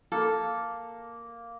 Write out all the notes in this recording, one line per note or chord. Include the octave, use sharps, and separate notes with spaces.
A#3 A4